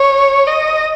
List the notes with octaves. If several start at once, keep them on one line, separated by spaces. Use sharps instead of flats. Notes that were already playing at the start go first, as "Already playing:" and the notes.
Already playing: C#5
D#5